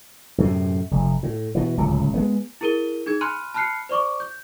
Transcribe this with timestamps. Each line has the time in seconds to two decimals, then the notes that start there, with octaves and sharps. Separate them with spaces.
0.38 F#2 A2 C3
0.91 F1
1.23 A2
1.55 B2 E3
1.77 D1 C#2 C#3
2.14 G#3 A3 B3
2.61 E4 G#4 A#4 D#7 G7
3.06 D#4 G#4 G#6
3.21 G#5 B5 C6 F6 F#6 D#7
3.54 A5 B5 F6 F#6 C7 C#7
3.89 C5 D5 C#6 D6
4.20 G6